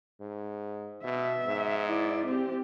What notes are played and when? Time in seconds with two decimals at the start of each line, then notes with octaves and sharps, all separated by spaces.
0.20 G#2
1.04 B2 E5
1.46 G#2
1.88 E4 D5
2.26 C4 G4